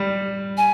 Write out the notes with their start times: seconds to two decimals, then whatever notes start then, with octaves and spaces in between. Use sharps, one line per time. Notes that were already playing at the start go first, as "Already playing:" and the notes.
Already playing: G3
0.57 G#5